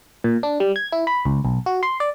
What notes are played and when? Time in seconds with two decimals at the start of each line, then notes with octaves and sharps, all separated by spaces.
0.24 A#2
0.43 D4
0.60 G3
0.76 G#6
0.92 E4
1.07 B5
1.25 C#2
1.45 B1
1.66 F#4
1.83 C6
2.00 D5